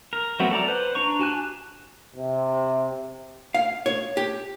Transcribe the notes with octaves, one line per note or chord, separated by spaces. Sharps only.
A#4
F#3 A3 B3 C4 F#4
A4 D5 A#5
B4 C5
D4 A#5 C#6
F#4 G4 G#5 A5 F#6
C3
F5
C#5
G4